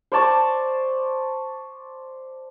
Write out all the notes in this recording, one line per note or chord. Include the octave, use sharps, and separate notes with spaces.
C5 D5 A5 C#6